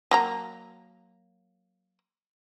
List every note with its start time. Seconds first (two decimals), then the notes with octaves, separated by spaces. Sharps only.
0.11 F#3 A#3 A#5